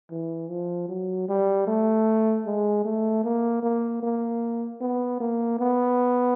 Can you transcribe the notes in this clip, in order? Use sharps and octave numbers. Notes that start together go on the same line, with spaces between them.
E3
F3
F#3
G3
A3
G#3
A3
A#3
A#3
A#3
B3
A#3
B3